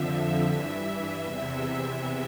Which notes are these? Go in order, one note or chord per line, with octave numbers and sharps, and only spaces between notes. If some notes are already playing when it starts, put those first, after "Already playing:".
Already playing: F2 D3 F3 E5
G2 E3 E5
E2 C3 E3